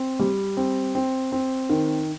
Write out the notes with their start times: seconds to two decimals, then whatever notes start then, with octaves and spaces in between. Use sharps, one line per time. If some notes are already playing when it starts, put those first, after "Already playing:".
Already playing: C4
0.19 G3
0.57 C4
0.95 C4
1.32 C4
1.70 D#3